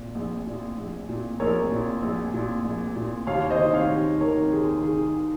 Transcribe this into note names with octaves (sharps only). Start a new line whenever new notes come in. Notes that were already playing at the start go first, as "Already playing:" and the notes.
Already playing: A#2
A#1
A#2
A#1
A#2
A#1 A#4 C#5
A#2
A#1
A#2
A#1
A#2
D#2 C#5 F5
C5 D#5
D#3
C#5 F5
D#2
D#3 A#4 C#5
D#2 G#4
D#3 G#4